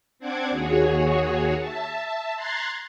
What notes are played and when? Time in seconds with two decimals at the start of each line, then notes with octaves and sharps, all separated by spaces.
0.19 C4 D4 F#5 D6 G#6
0.51 D#2 F#4 G#4 C#5
1.59 E5 A5
2.36 A#5 C6 F#6 G#6 A6 C7